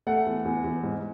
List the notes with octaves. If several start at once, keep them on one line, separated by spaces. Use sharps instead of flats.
A3 F#5
E2
E2
E2
G#2